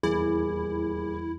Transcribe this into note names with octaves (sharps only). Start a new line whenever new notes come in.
D#1 E2 E4 G#4